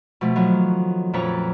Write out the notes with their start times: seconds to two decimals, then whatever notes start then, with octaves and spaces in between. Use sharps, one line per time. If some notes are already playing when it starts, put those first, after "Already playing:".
0.21 B2 F3 A3
0.36 D#3 F3 F#3 B3
1.13 F2 A#2 C#4 B4 C#5 A#5